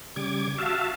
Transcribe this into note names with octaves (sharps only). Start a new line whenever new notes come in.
C#3 G3 D6 G#6
F#4 E5 F5 A5